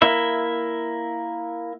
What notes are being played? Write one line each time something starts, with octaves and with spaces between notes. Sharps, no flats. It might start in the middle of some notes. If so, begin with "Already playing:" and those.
A#3 E4 E5